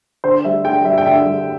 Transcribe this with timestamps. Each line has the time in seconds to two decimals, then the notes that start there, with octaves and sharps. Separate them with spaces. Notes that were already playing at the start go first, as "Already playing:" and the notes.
0.24 D3 C5
0.45 G3 E5
0.65 D3 G5
0.85 G3 E5
0.98 G5
1.06 D3 E5
1.26 G3